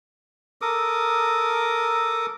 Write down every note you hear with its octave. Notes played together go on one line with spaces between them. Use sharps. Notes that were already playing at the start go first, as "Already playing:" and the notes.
A4 A#4 D6 D#6